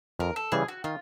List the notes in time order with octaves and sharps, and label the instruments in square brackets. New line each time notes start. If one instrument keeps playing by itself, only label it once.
[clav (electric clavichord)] F2 [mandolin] A#4
[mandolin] A4
[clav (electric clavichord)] C#3 E3 G3 [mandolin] G#4
[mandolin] F#4
[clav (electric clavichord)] D#3 [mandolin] F4